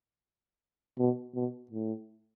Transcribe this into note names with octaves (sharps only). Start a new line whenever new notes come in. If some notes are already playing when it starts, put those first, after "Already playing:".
B2
B2
A2